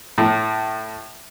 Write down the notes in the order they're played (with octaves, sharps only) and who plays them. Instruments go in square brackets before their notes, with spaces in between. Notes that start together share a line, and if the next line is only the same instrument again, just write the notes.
[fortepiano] A2